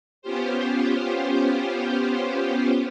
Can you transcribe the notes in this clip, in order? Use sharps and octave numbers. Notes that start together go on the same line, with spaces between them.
B3 C#4 F4 G4 C5